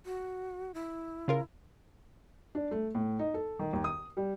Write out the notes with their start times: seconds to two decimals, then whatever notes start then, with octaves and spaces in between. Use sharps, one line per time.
0.06 F#4
0.74 E4
1.28 C#3 F4 A#4
2.55 D4
2.71 A3
2.95 A2
3.19 D#4
3.34 A4
3.59 D#3
3.73 D#2
3.84 D#6
4.17 G3